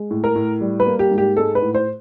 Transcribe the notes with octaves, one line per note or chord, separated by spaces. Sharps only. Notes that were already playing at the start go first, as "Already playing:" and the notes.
Already playing: G#3
A2
A#4
A2
G3
B4
A#3
G4
G#2
G4
G#3 A4
B4
A2
C5